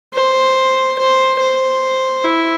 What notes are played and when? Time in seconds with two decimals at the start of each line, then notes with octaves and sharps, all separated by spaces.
0.14 C5
0.98 C5
1.39 C5
2.24 E4